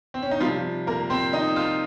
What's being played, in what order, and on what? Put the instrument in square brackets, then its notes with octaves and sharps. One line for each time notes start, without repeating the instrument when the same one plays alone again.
[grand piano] C4
C#4
D#4
C3 F3 G3 F4
A#3 A#4
C4 C5
D#4 D#5
F4 F5